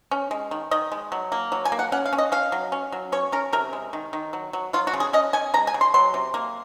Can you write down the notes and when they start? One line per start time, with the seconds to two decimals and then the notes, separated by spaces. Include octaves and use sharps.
0.11 C#4
0.31 G#3
0.51 D#3
0.71 D#3 D#5
0.92 G#3
1.12 F#3
1.32 A#3
1.52 F#3
1.65 G#5
1.72 A#3
1.79 F#5
1.92 C#4 F#5
2.06 F5
2.13 C#4
2.18 D#5
2.32 C#4 F5
2.52 F#3
2.72 C#4
2.92 F#3
3.12 C#4 C#5
3.32 C#4 A#4
3.53 C3 A#4
3.73 G#3
3.93 D#3
4.13 D#3
4.33 F#3
4.53 F#3
4.73 F#3 F4
4.87 F#4
4.94 C#3
5.00 G#4
5.13 C#4 D#5
5.33 C#4 G#5
5.54 G#3 A#5
5.67 G#5
5.74 C#3
5.81 C6
5.94 F#3 C6
6.14 C3
6.34 A#3